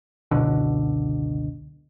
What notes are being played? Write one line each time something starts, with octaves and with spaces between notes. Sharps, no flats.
F#1 C#2 B2 D3